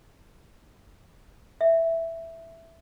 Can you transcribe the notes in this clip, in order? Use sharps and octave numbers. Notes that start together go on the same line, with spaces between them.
E5